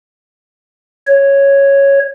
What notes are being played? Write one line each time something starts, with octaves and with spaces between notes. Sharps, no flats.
C#5